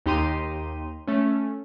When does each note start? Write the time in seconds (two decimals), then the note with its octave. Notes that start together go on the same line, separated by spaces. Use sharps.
0.06 D#2 D#4 G4 A#5 C6 D#7
1.07 A3 C#4